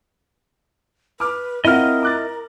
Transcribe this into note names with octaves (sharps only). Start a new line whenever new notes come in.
B4 D6 F6
C4 E4 F4 A#4 D#5 F#5 F6
D6 F#6 A6